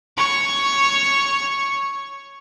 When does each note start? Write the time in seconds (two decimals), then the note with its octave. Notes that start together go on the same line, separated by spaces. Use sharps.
0.18 C#5 C#6